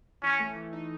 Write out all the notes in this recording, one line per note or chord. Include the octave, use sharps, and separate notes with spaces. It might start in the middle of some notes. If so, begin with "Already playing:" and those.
E3 C#4
A3
E3
D#4